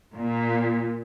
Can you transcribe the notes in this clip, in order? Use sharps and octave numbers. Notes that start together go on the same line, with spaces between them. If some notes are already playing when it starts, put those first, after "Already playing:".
A#2